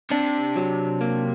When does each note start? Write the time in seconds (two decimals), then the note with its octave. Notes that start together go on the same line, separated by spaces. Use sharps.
0.11 C3 D4
0.56 F#3
1.01 A#3